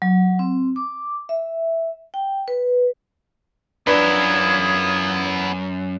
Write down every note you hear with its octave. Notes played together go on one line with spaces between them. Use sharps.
F#3
C4
D6
E5
G5
B4
F#2 B3 D4 E4 F4 B4 D#6 G#6